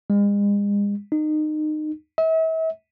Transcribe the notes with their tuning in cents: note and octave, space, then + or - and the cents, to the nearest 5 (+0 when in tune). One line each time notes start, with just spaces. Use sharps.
G#3 -40
D#4 -25
E5 -40